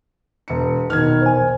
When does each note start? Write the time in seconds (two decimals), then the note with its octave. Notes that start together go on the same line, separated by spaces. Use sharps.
0.48 E1 C#7
0.90 A#1 E2 B2 D#3 F6 G#6
1.22 C5 G#5